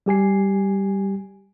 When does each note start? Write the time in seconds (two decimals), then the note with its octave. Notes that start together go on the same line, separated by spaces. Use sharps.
0.06 G3 G4 G#5 C7